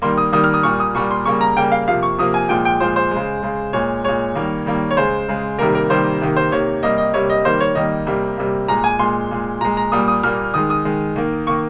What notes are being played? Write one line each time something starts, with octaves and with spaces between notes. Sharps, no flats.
D#3 G3 A#3 C6
D#6
D#3 G3 A#3 D#6
F6
D#6
A#2 G3 A#3 C#6
D#6
A#2 G3 A#3 C#6
C6
C#3 G3 A#3 C#6
A#5
C#3 G3 A#3 G5
F5
C3 F3 A#3 F5
C#6
C3 F3 A#3 D#6
G#5
A#2 F3 G#3 G5
G5
A#2 F3 G#3 C5
C5
C#3 G#3
C#3 G#3
A#2 G#3 C#5
A#2 G#3 C#5
D#3 G3 A#3
D#3 G3 A#3
C#5
C#3 G#3 C5
C#3 G#3
C3 D#3 G3 A#3 A#4
A#4
C3 D#3 G3 A#3 C5
C3 D#3 A#3
C5
C3 D#3 A#3 C#5
C3 G3 A#3 D#5
D#5
C3 G3 A#3 C#5
D#5
D#3 G3 A#3 C5
C#5
D#3 G3 A#3 D#5
C3 G3 A#3
C3 G3 A#3
A#2 G#3 A#5
G#5
A#2 G#3 C6
A#2 G#3
A#2 G#3 A#5
A#5
A#2 G3 A#3 D#6
D#6
A#2 G3 A#3 F6
D#3 G#3 D#6
D#6
D#3 G#3
D#3 A#3
D#3 A#3 C#6